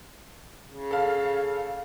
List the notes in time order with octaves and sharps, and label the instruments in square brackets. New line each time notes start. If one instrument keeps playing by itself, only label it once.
[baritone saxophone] C#3
[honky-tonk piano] A4 F5